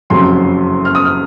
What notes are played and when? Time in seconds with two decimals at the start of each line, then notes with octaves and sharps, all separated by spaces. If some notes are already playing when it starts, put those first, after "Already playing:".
0.10 F#1 F2 C3 F#3 C#4 C6
0.85 F6
0.95 D#6
1.05 F6